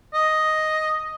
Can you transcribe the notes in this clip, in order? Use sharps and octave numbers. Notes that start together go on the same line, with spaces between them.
D#5